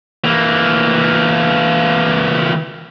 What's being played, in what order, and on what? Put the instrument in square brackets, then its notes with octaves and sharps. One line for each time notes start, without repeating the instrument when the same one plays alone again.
[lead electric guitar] E3 A#3